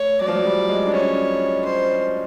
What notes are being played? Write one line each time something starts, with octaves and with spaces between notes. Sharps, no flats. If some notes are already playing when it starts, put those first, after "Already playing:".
Already playing: A3 C#5
F#3 D5
F3
F#3
G3
G#3
D4
C#4 C#5
C5